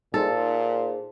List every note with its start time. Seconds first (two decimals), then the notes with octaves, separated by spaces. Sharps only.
0.14 A#2 D#4 G#4 A4 C5